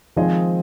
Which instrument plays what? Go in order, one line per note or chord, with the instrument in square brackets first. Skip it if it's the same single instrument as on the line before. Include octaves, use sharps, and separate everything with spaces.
[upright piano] D#3 G#3 C4 G#4 D#5 [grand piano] F3